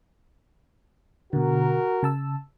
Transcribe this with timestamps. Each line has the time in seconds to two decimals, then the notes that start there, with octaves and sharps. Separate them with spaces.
1.33 B2 D3 F#4 A#4
2.03 C#3 A5 E6